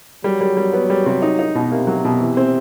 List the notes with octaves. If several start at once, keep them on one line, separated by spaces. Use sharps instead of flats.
F#3 G3
G3
G3
B3
G3
C3
D#4
D#4
B2
C3 A#3
F#3
B2
E3
C4